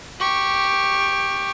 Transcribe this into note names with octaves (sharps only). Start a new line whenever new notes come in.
G4 C#6